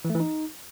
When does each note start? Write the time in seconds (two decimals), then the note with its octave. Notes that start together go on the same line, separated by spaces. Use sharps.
0.05 E3
0.10 A3
0.15 E3
0.20 D#4